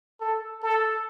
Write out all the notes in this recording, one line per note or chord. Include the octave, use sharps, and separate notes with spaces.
A4
A4